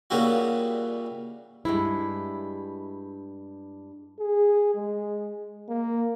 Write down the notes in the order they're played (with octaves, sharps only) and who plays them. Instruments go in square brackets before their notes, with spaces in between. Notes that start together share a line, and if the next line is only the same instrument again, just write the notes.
[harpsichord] A#2 C#3 E3 G3 F#4
[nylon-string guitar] G2 G#3 E4
[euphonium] G#4
G#3
A#3